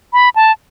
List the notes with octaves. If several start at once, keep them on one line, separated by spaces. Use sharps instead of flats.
B5
A5